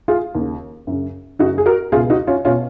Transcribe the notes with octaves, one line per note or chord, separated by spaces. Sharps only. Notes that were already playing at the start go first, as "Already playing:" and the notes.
F4 G#4
D#2 C#3
F#2 C#3
F#2 C#3 D#4 F#4
G#4
F#4 A#4
C#2 B2 F4 G#4
D#4 F#4
C#4 F4
B2 C#4 F4